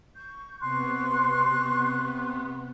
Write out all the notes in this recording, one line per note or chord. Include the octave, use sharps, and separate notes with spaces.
C#6 G6
C3 B3 C6 C#6 F#6